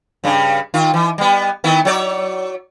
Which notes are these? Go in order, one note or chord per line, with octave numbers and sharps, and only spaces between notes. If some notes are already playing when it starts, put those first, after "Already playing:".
G2 C#3
D#3 F4
E3
G3 B3
D#3 B3 E4
F#3 C#5 D5